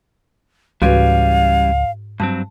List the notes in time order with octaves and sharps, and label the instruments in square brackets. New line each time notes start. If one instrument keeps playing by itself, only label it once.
[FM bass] C#2 [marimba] G#2 F#4 B4 [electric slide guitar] E3 G3 C#4 [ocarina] F5
[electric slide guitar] G2 F#3 C4 [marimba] A5